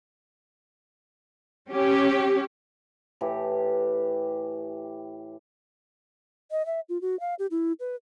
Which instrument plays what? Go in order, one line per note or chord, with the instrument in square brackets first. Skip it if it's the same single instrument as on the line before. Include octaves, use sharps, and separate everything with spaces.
[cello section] C#4 G4
[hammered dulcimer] A2 E3 G4
[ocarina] D#5
E5
F4
F#4
F5
G4
E4
B4